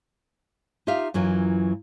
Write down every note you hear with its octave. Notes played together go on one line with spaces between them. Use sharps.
D#4 F4 G4 E5 F5
F#2 E3 F#3 F4